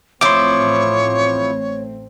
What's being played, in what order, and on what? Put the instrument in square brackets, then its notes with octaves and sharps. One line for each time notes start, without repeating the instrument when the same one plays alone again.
[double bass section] A1 A3 C4 [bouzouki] F3 E4 [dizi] C#5 [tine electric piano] C6 D6